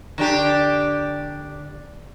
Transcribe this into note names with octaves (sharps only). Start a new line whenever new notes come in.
D3 D4 G4